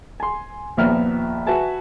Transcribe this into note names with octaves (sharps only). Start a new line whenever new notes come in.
G#5 C6
A#1 D#2 F3 B3 E5 F6
F#4 B4 E5 G#5 A5